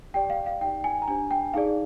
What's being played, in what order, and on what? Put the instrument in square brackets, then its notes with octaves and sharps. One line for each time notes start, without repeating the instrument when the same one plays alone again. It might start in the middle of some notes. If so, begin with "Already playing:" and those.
[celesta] G4 D5 G5
F5
F5
D#4 G4 D5 G5
G#5
A#5
D4 G4 C5 G#5
G5
D#4 G#4 D5 F5